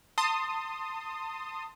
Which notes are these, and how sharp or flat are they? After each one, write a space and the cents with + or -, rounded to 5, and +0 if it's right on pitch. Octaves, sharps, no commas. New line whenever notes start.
A5 +30 C6 +0 D#6 +0